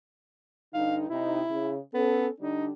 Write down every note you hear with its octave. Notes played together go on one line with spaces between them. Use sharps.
G2 D3 D#4 F5
C3 D#4 E4
C#3
B3 C#4 A4
D3 G3 D4 D#4